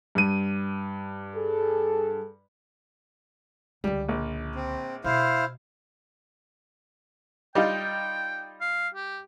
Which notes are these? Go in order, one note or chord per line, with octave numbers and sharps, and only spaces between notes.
G2 D#7
G#4 A4
C#2 D3 G3
A#1
C4
B2 E4 C5 F5
G3 D#4 F4 G5
F5
G4